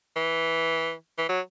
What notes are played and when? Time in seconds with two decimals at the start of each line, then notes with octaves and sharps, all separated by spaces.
0.16 E3
1.18 E3
1.29 F#3